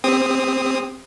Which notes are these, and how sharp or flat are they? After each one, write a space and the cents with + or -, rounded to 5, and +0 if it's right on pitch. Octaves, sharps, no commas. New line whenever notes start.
C4 +0 G4 +40 D#6 +0